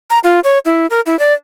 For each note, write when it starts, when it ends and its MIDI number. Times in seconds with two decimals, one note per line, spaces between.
0.10 0.19 82
0.24 0.40 65
0.44 0.59 73
0.65 0.86 64
0.90 1.00 70
1.06 1.18 64
1.19 1.33 74